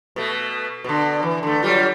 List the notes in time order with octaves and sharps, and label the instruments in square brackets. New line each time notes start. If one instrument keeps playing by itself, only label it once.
[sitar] B2 A3
B2 D3
E3
D3 A3
F#3 G3 F4